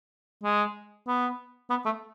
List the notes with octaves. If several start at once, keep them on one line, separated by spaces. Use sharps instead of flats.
G#3
B3
B3
A3